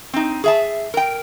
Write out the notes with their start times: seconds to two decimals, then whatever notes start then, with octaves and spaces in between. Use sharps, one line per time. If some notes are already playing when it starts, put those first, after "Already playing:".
0.13 C4 D#4
0.44 G#4 E5 A5
0.94 A#4 G5